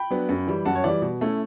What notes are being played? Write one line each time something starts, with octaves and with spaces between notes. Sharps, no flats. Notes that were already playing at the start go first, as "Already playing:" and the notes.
Already playing: G5 B5
F#3 B3 D4
F#2
E3 G3
F#2 F#5 A5
C#5
E3 G3 D5
B2
A3 C#4 E4